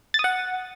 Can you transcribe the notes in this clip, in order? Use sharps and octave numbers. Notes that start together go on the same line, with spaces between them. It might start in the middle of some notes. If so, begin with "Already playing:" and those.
A6
D#6
F#5